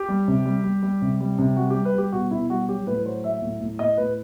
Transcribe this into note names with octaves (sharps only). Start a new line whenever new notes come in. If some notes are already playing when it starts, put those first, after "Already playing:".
Already playing: G4
G3
C3
G3
G3
G3
C3
G3
C3
G3 F#4
G3 G4
B4
G3 G4
B2 F#4
B2 E4
G3 F#4
F#3 G4
A2 B4
F#3 C5
F#3 E5
A2
A2
A2 D#5
A2 B4